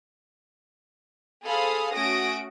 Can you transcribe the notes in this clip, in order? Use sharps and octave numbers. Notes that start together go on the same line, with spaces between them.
G#4 A4 C5 F5 B5 D#6
A3 C#4 F#4 D#6 A#6 D7